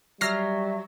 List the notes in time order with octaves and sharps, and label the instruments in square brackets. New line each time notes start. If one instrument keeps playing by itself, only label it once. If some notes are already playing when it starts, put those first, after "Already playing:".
[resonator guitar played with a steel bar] F#3 [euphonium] G3 [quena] E5 [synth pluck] F6 A#6 C7